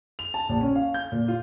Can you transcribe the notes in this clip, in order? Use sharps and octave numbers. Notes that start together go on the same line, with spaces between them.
F7
A5
A#1
C#4
F5
G6
A#2
F4